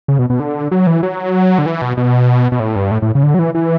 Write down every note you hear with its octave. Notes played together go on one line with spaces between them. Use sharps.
C#3
B2
B2
D3
F#3
E3
F#3
D3
E3
B2
B2
B2
A2
G2
A2
A2
C#3
D3
F#3
E3
E3